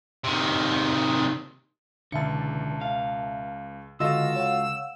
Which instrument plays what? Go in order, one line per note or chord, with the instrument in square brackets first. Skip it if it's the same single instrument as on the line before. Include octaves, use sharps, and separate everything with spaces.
[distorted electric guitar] C3 D#3
[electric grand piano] C#2 C#7 [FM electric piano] B2 E5 A5 [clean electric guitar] D3 E3
[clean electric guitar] F5
[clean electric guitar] C#2 [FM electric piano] D3 D#5 A#6 [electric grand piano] F4 F#4 A4 [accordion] E6
[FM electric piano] C#5 F5 F#5